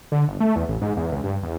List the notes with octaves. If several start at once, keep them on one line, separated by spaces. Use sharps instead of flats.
D3
G1
A3
E2
A1
G#2
E2
C#2
G2
E2